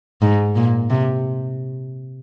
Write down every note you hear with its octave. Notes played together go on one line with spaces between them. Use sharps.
G#2
A#2
C3